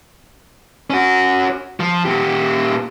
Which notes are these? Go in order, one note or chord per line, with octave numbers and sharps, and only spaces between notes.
C#4 F#4
F3
A#2 G4